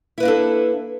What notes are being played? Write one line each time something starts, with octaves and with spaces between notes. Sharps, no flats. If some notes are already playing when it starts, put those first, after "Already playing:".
A#3 D4 E4 A4 B4